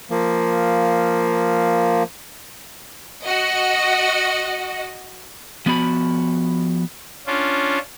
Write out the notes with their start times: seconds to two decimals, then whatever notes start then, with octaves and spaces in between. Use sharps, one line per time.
0.11 F3 A#3
3.24 F#4 D#5
5.66 F3 B3 F#4 B5
7.26 C#4 D4 F4